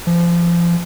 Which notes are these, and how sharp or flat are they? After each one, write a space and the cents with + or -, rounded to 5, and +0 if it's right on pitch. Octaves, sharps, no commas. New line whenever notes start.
F3 -30